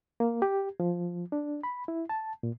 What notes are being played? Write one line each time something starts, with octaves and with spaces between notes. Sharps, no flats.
A#3
G4
F3
D4
B5
E4
A5
A#2